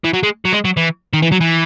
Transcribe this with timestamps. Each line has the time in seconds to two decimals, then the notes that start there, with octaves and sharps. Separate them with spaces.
0.04 E3
0.13 F#3
0.23 G#3
0.45 F#3
0.53 G#3
0.65 F#3
0.77 E3
1.13 D#3
1.22 E3
1.32 F#3
1.41 E3